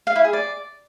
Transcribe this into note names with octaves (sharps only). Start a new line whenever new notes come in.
F5
E4
G#4
D5